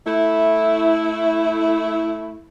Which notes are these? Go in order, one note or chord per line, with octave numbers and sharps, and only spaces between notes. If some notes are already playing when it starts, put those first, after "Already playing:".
A3 E4